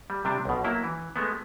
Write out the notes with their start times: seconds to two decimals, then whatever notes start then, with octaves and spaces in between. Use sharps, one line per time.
0.10 G3
0.25 C3 G3 D4
0.45 B1 B2
0.64 F#3 A#3 E4
0.84 E3
1.16 G#3 A3 B3